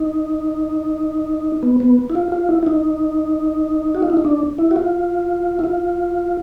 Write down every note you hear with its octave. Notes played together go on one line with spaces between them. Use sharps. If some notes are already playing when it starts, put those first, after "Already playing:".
Already playing: D#4
B3
B3
E4
F4
F4
E4
E4
D#4
F#4
F4
E4
D#4
D4
E4
F#4
F4
E4
F4